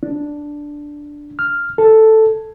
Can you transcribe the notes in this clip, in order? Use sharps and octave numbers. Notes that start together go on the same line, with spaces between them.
D4
F6
A4